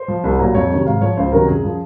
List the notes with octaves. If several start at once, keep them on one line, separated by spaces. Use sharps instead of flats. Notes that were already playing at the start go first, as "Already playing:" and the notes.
Already playing: C5
F3
C2
A#2 F#3
F2 C#5
C3 D#3 F#3
G#2 F5
F3 C#5
C#2 C5
C3 D#3 F#3 A#4
F#2 G#4
F3